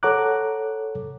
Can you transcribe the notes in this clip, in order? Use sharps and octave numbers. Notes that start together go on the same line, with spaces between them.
A4 C#5 F#5 A#5 D6 F#6